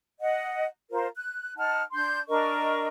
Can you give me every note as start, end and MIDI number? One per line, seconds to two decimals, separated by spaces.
0.20 0.66 75
0.20 0.66 78
0.91 1.07 65
0.91 1.07 70
0.91 1.07 72
1.16 1.53 90
1.57 1.81 63
1.57 1.81 78
1.57 1.81 81
1.57 1.81 89
1.92 2.18 62
1.92 2.18 84
1.92 2.18 91
2.28 2.87 62
2.28 2.87 70
2.28 2.87 75
2.28 2.87 85